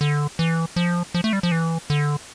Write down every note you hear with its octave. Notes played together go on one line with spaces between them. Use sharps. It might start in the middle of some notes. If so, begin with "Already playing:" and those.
D3
E3
F3
F3
A3
G3
F3
E3
D3